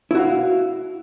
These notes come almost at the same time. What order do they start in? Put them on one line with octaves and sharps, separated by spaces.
E4 F#4 F5